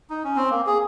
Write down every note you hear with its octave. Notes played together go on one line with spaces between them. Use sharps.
D#4
C#4
C4
A#3
G#4